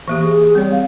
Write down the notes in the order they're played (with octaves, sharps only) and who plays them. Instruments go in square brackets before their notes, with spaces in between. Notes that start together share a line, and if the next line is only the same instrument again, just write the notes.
[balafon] E3 A#3 G4
[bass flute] G#4
[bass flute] G3 [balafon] C4 C#5
[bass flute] F5